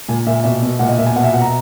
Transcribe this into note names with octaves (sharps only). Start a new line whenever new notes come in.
A#2 G#5
A#2 E5
B2 E5
B2
A#2 F#5
D#5
A#2 E5
G#5
B2 F#5
E5
B2 F#5
A#5